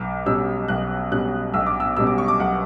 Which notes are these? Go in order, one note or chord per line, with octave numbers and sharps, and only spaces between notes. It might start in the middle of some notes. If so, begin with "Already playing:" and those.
Already playing: B1 D6
B2 G3 C#4 E6
B1 F#6
B2 G3 C#4 F#6
B1 E6
D6
E6
B2 G3 C#4 E6
D6
C#6
D6
B1 F#5